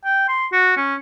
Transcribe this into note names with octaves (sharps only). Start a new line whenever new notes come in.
G5
C6
F#4
C#4